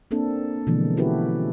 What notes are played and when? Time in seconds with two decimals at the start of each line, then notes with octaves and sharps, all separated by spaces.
0.11 A#3 C4 D4 A4
0.67 B2 D3 E3 F3 G#3 A#3
0.97 C#4 E4 F#4 G4 A4 B4